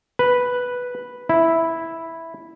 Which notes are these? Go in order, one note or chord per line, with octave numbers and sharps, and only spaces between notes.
B4
E4